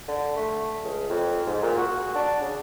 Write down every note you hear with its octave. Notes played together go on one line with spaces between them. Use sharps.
D3
A3
C#2
F2
G#2
A#2
F#4
D4
C#3